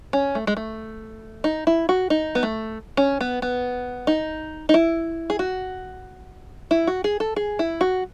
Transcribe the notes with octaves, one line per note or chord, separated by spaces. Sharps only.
C#4
A3
G#3
A3
D#4
E4
F#4
D#4
B3
A3
C#4
B3
B3
D#4
D#4
E4
G#4
F#4
E4
F#4
G#4
A4
G#4
E4
F#4